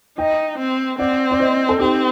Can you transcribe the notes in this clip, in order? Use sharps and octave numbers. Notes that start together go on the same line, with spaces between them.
D#4 D#5 G5
C4
C4 D5 F#5
D5
C5 D#5
A4
C4 D#4 G4